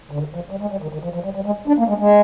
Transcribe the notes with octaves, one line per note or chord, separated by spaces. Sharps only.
D3
D#3
F3
G3
G#3
G3
D#3
D#3
F3
F3
G3
G3
G#3
D4
A#3
G#3
G#3